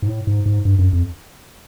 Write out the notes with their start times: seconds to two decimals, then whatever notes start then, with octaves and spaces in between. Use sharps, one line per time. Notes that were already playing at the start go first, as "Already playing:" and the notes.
0.02 G#2
0.08 A2
0.27 G#2
0.46 G#2
0.65 G2
0.79 F#2
0.93 F2